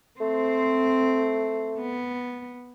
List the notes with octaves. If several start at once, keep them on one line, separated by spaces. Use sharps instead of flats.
A3 C4 C5
B3